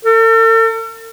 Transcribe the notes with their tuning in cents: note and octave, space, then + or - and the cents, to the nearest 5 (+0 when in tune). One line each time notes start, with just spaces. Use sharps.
A4 +45